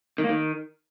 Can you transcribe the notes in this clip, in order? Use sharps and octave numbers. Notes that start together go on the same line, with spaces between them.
D#3
A#3
D#3